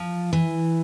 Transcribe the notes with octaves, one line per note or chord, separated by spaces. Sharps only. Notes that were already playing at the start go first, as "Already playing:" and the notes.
Already playing: F3
E3